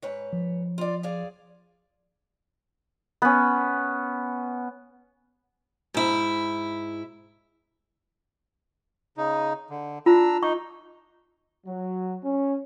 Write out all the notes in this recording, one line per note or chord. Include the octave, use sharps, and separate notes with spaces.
G#2 B4 C#5
F3
F4 D5
G#4 D5 F5
B3 C#4
G#2 E4
C#3 D#4
D3
D4 F4 A#5 E6
D#4 C#6
F#3
C#4